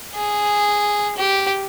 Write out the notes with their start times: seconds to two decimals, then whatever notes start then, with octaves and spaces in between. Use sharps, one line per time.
0.15 G#4
1.18 G4